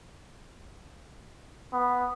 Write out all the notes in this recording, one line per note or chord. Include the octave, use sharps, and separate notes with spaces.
B3